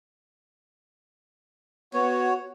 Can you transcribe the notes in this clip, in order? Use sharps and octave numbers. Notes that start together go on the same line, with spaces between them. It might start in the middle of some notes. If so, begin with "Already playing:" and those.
B3 F#4 C#5